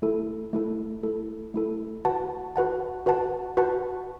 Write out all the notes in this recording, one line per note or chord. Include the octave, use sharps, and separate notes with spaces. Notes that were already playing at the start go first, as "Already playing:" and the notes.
A3 E4 A4
A3 E4 A4
A3 E4 A4
A3 E4 A4
F#4 B4 F#5 A5
F#4 B4 F#5 A5
F#4 B4 F#5 A5
F#4 B4 F#5 A5